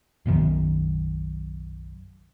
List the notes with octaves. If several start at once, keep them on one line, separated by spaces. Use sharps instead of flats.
F#1 B1 F#2 D#3